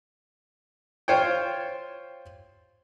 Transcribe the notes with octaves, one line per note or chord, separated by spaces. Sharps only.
F4 C5 C#5 G5